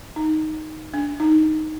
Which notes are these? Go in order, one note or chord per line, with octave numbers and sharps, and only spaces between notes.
D#4
D4
D#4